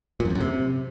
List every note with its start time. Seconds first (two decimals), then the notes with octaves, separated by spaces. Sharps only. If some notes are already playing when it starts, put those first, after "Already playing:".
0.20 A#2
0.25 F#2
0.30 F2
0.35 F#2
0.40 C3